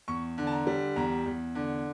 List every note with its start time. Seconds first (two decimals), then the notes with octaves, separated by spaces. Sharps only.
0.08 E2 C#6
0.38 D3
0.47 A5
0.51 A#5
0.67 G3
0.96 E2 A#5
1.26 E2
1.55 D3